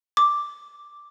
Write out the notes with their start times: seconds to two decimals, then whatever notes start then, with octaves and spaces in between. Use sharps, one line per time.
0.17 D6